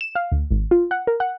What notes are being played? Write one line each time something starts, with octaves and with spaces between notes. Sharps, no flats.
E7
F5
D2
G#1
F4
F#5
A#4
F#5